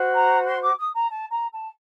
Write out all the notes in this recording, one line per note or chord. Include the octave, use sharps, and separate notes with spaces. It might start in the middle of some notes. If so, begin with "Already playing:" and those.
Already playing: F#4 C5
A#5
C6
D6
D#6
A#5
A5
A#5
A5